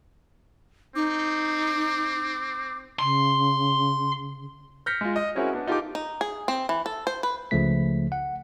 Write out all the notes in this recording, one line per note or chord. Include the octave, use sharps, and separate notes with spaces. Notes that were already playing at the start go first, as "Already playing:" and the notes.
C4 D#4 D6
C#3 C6
F6 G6 A#6 B6 C#7
G#3 F4
D#5
C4 C#4 E4 F#4 G#4 A#4
B3 D4
D#4 F4 G4 A4 G5 D6
D#4
G#4
C4
E3
A4
C5
B4
C#2 C#3 F3 A3 B6
F#5